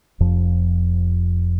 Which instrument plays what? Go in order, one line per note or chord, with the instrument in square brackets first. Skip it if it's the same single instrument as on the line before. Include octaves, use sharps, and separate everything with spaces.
[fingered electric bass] F1 F2 F3